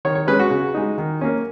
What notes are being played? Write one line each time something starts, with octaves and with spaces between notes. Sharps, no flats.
D#3 C#5
C#5
G#3 C#4 B4
F#4
C#3
G#3 D#4
D#3
A#3 C#4